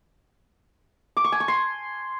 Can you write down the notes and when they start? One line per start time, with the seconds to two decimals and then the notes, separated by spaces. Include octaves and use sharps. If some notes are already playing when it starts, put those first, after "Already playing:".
1.17 D6
1.24 C#6
1.32 G#5
1.40 C#6
1.48 C6